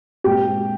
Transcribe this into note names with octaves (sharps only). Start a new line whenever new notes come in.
A#2 G#3 C4 G4 G5